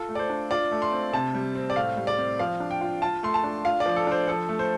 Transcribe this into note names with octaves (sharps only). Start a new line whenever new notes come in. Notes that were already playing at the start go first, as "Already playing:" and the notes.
Already playing: F4 A4
A3
D5
C5
D4
F4 D5
A3
C6
C4
C3 A5
G3
C4
D5
A2 F5
G3
D5
C4
F3 F5
D4
G5
F4
F4 A5
A3 C6
A5
D4
F4 F5
D5
F3
A4
D4 C5
F3 A4
A3
C5